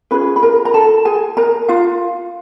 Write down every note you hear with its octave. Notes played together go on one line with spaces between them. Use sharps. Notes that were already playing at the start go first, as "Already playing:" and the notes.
C#4 F4 G#4 B4 B5
B5
A#4 A#5
A#5
A4 A5
G#4 G#5
A#4 A#5
F4 F5